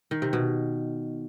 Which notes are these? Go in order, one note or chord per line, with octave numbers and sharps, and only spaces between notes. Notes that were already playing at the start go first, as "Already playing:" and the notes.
D#3
C3
B2